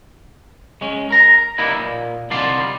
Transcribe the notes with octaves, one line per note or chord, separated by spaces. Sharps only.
G#3 C#4
A#4 A#5
G3 A#3 D#4 E4 B4
A#2
C2 D3 D#3 F4 D5 F5
G3